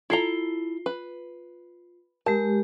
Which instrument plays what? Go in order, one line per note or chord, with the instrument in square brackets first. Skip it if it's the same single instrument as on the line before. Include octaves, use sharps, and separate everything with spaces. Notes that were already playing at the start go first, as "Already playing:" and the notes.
[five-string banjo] E4 A4 A#5 [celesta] F4 C7 G7
[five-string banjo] B4
[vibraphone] G#3 G4 [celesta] A#4 [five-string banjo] A5